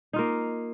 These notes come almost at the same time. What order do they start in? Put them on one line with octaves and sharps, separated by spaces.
D#4 F4 A#3